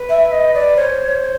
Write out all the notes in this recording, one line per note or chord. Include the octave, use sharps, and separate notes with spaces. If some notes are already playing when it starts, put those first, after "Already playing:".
Already playing: B4
E5
D#5
D5
C5 C#5
C#5